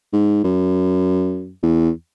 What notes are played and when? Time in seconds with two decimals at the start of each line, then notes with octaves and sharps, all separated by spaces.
0.13 G#2
0.44 F#2
1.63 E2